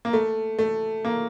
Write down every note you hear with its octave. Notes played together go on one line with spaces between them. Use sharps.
A#3
A3
A3
A#3